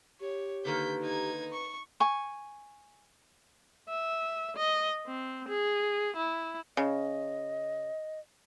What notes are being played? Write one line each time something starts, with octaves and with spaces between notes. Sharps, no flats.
G4 C#5
D3 D#3 A#3 B4 G6 B6
D#4 G#6
C#6
G#5 C#6
E5
D#5
C4
G#4
E4
C#3 D#5